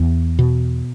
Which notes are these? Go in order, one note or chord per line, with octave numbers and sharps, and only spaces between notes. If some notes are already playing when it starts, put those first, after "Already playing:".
Already playing: E2
B2